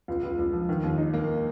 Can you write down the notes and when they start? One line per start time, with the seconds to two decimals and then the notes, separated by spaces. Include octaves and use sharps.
0.08 C#2
0.23 C#2
0.39 C#2
0.53 F3
0.69 D#3
0.83 D#2
0.98 D#4
1.14 A#3